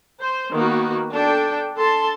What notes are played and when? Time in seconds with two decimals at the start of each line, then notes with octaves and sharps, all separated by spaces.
0.20 C5
0.52 D#3 A#3 B3 F#4
1.11 D4 A4 G5
1.77 A4 A5 C6